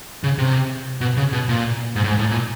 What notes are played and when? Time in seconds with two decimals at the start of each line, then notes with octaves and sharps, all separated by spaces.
0.24 C#3
0.38 C3
1.01 B2
1.17 C#3
1.33 B2
1.49 A#2
1.96 G#2
2.04 A2
2.07 G#2
2.19 A2
2.31 A#2